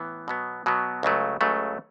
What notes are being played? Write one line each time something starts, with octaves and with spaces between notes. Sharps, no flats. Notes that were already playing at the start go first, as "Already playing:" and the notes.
Already playing: A2 E3 B3
B2 F#3 B3
B2 F#3 B3
C#2 C#3 F#3 A3
C#2 C#3 F#3 A3